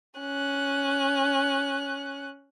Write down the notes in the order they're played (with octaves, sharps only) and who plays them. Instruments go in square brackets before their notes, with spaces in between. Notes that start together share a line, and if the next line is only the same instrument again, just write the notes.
[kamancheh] C#4 F#6